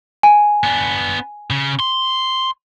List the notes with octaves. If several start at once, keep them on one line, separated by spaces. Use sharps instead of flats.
G#5
B3 D4
C#3
C6